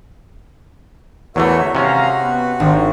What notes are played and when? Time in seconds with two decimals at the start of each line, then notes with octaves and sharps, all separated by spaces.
1.36 E2 E3 A3 F#4 A#4 C#5 E5
1.75 G#1 C3 C#4 F#4 F5 A#5
2.22 B3 B4
2.60 G#1 D4 D#4